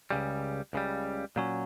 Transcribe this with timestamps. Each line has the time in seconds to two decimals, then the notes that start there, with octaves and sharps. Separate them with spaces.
0.11 C#2 C#3 G3
0.73 C#2 C#3 G3
1.36 A#2 F#3 C#4